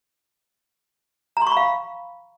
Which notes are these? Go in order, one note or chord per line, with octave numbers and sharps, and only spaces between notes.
A#5
C6
C#6
B5
F5